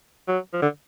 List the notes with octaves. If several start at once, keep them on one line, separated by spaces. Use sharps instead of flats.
F#3
F3
D3